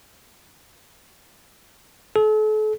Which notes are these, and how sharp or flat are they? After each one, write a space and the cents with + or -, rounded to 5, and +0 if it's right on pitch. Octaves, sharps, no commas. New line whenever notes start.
A4 -40